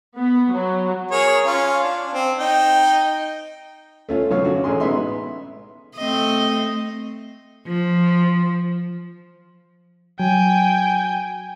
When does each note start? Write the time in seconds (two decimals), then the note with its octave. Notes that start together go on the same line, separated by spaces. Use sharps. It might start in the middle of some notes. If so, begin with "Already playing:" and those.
0.16 B3
0.52 F#3
1.11 G#4 A#4 C#5
1.45 C#4 F4
1.84 D4
2.14 C4
2.39 D#4 G5
4.09 A3 C#4 F4
4.31 F#2 D3 C#5 F5
4.44 C#4 D4 F#4
4.64 A1 C#4 G#4 C6
4.80 G#3 B3 D#4 E5 C6
5.97 A3 C4 D#5
7.68 F3
10.20 F#3 G5 G#5